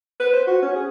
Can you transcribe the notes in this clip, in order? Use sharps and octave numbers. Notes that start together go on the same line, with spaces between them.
B4
C5
F#4
C#4
G#4